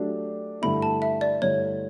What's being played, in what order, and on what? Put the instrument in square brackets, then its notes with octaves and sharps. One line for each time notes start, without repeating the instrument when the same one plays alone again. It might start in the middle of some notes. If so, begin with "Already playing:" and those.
Already playing: [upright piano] F#3 A3 D4 G4
[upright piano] G2 D3 A3 E4 [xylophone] B5
[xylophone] A5
E5
D5
[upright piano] G2 D3 A3 E4 [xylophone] C#5